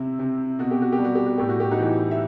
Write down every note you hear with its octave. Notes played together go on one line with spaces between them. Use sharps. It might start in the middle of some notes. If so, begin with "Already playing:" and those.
Already playing: C3 C4 E4
C3
B2 F#4
G4
F#4
G4
G3
F#4
G4
F#4
A2 G4
F#4
G4
D#4 F#4
E3
E5